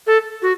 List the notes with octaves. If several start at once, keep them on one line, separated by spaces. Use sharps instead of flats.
A4
F#4